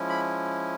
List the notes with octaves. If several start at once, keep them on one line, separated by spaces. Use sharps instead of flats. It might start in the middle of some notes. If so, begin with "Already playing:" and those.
Already playing: F3 G#3 C#4 E4
B5